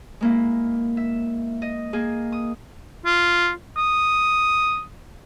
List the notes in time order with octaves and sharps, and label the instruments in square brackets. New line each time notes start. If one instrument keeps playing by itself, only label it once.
[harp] G#3 A#3 E4
E5
D#5
A#3 G#4
D#6
[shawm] F4
D#6